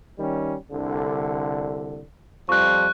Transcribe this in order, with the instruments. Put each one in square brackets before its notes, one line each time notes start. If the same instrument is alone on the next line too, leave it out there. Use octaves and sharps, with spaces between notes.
[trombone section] D#3 G3 C#4
C2 D3
[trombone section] F2 F3 G3 [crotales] C#6 F#6